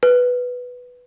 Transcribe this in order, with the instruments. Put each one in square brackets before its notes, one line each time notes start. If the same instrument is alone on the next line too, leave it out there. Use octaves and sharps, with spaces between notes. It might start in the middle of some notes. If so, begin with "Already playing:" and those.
[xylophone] B4